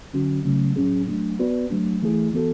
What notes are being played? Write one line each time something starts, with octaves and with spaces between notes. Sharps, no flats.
D3 F#3 C#4 F#4
C#3 F#3 A3 C#4
A2 F#3 C#4 G#4
F#3 A3 D4
B3 F#4 B4 D5
F#3 A3 D4
E3 A3 E4 G#4
E3 B3 F#4 A4